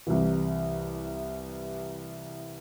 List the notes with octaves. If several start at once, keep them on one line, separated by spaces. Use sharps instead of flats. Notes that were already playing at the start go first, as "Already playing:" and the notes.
C2 C3 E3